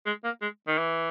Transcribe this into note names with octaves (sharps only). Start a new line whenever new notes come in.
G#3
A#3
G#3
D#3
E3